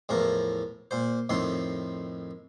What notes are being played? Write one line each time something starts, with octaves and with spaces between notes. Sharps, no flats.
E2 A2 F3 A#4
A#2 C5
F2 A2 D#3 C6